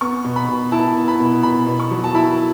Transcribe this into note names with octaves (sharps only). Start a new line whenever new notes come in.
B3 C#6
B2
B5
B2
E4 A5
B3
B5
B2
B2 B5
B2
C#6
F#3
A5
E4 B5